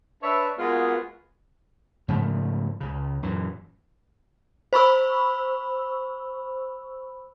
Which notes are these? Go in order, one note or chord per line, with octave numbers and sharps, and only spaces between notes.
D4 B4 C#5 E5
G#3 A#3 B3 F4 F#4 G#4
G#2 C#3 F3 A3
C#2 C#3
F#2 A#2 E3
C5 B5 C#6 E6